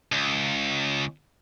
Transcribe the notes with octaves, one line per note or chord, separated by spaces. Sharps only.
C#2